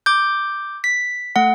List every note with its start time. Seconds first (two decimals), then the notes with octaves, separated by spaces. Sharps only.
0.06 D6 G6
0.84 B6
1.36 A3 F#5